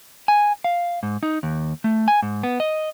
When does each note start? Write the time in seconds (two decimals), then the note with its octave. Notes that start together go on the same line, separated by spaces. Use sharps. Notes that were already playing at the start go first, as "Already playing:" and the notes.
0.28 G#5
0.64 F5
1.03 G#2
1.23 D#4
1.43 D#2
1.84 A3
2.08 G#5
2.22 G#2
2.43 B3
2.60 D#5